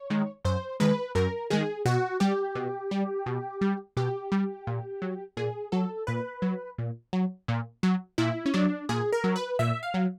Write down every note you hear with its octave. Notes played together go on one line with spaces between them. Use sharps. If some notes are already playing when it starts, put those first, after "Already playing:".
Already playing: C#5
D#3 G#3
F#2 C5
D#3 G#3 B4
F#2 A#4
D#3 G#3 G#4
B2 F#4
G3 G4
B2
G3
B2
G3
B2 G4
G3
A#2
F#3
A#2 G#4
F#3 A4
A#2 B4
F#3
A#2
F#3
A#2
F#3
A#2 E4
C#4
F#3 D4
A#2 G#4
A#4
F#3
B4
A#2 E5
F5
F#3